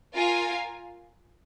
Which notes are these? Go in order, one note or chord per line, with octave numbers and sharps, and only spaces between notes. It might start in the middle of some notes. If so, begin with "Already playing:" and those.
F4 A#4 F5 G#5